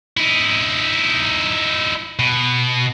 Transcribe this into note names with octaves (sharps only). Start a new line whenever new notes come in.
D#4 E4
B2